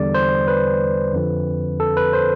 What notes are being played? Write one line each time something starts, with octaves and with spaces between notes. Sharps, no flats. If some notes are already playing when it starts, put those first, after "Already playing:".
Already playing: E2 D3 G3 D5
C5
B4
F2 D3 F3 C4
A4
B4
C5